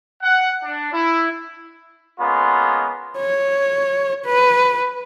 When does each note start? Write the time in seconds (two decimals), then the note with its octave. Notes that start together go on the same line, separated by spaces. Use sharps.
0.22 F#5
0.62 D4
0.92 E4
2.19 G#3 A#3 B3 C#4 F4
3.18 C#5
4.25 B4